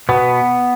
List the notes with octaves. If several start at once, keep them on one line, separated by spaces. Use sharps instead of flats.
B2 B3